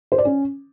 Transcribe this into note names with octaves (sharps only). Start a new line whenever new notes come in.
C5
D5
C#4